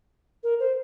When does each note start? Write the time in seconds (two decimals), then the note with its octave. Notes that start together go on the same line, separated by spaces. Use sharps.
0.43 A#4
0.60 C5